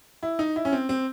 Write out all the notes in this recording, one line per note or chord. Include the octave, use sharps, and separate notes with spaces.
E4
D#4
E4
C#4
C4
C4